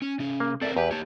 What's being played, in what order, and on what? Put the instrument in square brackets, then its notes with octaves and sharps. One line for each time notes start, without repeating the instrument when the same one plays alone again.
[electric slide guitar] C#4
C3 C#4
[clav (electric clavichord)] A#3
[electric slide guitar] C4 A#4 [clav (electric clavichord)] A4 D5 E5
[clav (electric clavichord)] E2 G4 [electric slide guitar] B4
[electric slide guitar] A#3 G4 [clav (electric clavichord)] C#5 A5